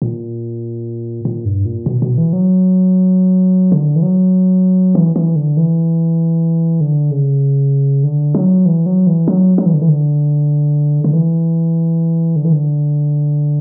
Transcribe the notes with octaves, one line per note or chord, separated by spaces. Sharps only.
A#2
A#2
G2
A#2
B2
B2
E3
F#3
D3
E3
F#3
E3
E3
D3
E3
D3
C#3
D3
F#3
E3
F#3
E3
F#3
F#3
E3
D3
E3
D3
D3
E3
D3
E3
D3